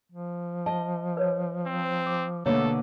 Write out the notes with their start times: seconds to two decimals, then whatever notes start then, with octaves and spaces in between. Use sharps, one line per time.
0.12 F3
0.66 D#5 A5
1.17 B4 C#5
1.66 C4
2.06 D6
2.46 B2 D3 A3 A#3 A4 C#5 C#6